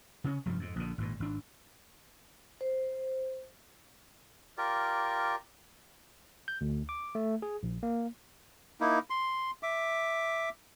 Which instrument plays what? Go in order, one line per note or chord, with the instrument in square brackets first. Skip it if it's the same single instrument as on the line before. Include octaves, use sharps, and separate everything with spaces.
[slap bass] C#3 C#4
F1 G2 F3 G3
F2 G#2
A#1 D3
G#1 G2 A#2
G#1 D4
[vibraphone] C5
[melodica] F4 G4 A#4 D5
[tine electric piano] G6
D2
D6
A3
G#4
A#1
A#3
[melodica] A#3 D#4 E4
C6
E5 D6